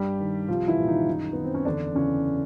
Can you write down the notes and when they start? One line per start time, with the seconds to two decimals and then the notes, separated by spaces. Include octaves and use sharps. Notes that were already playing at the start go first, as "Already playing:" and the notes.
Already playing: G2 G3 G4
0.20 D#3
0.48 C2 F3 F4
0.68 E3 E4
0.78 A#2
0.88 D#3 D#4
1.07 F#2
1.33 D#3 B3
1.44 C4
1.54 C#4
1.65 E2 D3 D4
1.95 C#3 E3 C#4